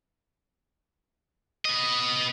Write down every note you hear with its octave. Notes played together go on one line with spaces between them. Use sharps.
B3 D#5